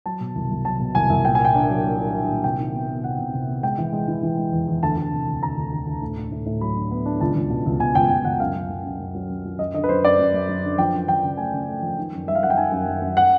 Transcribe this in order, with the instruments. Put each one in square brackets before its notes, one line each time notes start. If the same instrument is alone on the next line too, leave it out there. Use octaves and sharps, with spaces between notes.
[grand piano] F#3 A5
B2
C2
C2
F#3 A5
B2
C2 G#5
C2
A#2 G5
A#3 G#5
G5
D4
F#3
A#3
D4
D4
A#2
C3 G5
D#3
B3
B3
C3 F#5
C3
C3
B3
G#3 G5
E3
G#3
E3
E3
G#3
E2
E2
D2 A5
D2
C3
D2
D2 A#5
D2
D2
D2
A2
D4
A2
A2
F#3 B5
D4
B3
D4
C#2 A5
C#2
B2
C#2
B2 G#5
C#2 G5
C#2 G5
C#2 F#5
F#2 F5
F#2
F#2
F#2
F#2
F#3
F#2
F#3
F#2 D#5
D3 D#5
B4
F#2 C5
F#2 D5
F#2
F#2
F#2
D3
F3 G5
F#2
F3 G5
C#3
A3 G#5
C#3
A3
F3
D#3
F#2
G3 E5
F5
F#2 F#5
G5
D#3 G#5
F#2
F#2
F#2
F#5